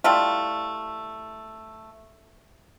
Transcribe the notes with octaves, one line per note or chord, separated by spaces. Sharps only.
G3 A3 E4 F4